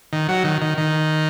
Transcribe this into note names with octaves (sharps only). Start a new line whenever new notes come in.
D#3
F#3
D#3
D#3
D#3